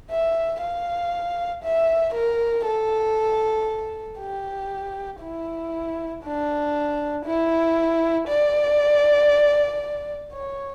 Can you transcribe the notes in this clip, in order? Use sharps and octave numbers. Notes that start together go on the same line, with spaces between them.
E5
F5
E5
A#4
A4
G4
E4
D4
E4
D5
C#5